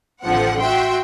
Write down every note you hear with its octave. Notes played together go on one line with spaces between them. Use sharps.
A1 D3 F3 C4 F#5
F#4 E5 G5 C6